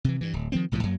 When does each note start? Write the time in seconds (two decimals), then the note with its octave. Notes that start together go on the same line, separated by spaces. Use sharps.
0.04 C3 E3
0.21 G2 E3
0.33 D1
0.52 D#3 F3 B3 C4
0.72 B1 A2 E3 F3
0.83 F#2 F#3 A#3